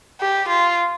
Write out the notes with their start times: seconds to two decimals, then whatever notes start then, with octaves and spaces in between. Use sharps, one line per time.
0.21 G4
0.49 F4